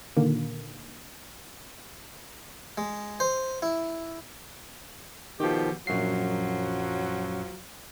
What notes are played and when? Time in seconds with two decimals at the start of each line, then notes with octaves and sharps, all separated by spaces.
0.16 A#2 D3 D#3 A#3
2.78 G#3
3.20 C5
3.62 E4
5.40 B2 D#3 F3 G4
5.87 A#1 F#2 F3 F#3 C7